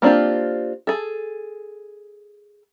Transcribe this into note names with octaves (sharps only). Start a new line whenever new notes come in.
A#3 C4 D4 F4 G4
G#4 A4